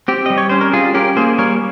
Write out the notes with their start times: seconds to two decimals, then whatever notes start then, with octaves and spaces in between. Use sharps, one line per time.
0.08 C4 G4
0.26 G3 D#5
0.38 C#5
0.49 C#4 C5
0.61 A#4
0.73 G3 F4 G#4
0.94 C#4 G4 A#4
1.17 A#3 G#4 C5
1.38 G3 A#4 C#5